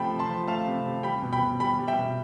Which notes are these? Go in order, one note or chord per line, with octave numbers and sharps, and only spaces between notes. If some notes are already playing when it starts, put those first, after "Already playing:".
Already playing: C3 F3 A3 G5 A5 B5
C3
A5 C6
F3
A3 F5 A5
C3
C3
G3 G5 B5
B2
G5 B5
B2
G3 G5 B5
G3
E5 G5
B2